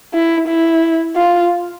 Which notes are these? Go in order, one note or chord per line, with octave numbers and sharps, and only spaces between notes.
E4
E4
F4